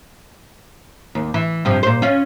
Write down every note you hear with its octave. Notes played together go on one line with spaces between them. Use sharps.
D#2
E3
G2 C3 F3
A#2 C5
C#4 F4